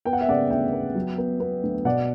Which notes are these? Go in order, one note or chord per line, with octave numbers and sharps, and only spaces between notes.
B3 G5
F#5
E5
C#3 D5 F#5
D2 E5 G5
B3
F#3
B3
B3
D2
B2 D5 F#5